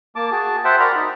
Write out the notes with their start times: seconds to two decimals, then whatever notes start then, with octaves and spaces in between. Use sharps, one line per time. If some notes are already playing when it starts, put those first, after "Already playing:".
0.16 A#3 A5 D6
0.31 F#4 G#4 A5
0.65 C5 E5 F#5 G5 A5
0.80 F#4 A#4 D5 A#5 B5
0.96 D#4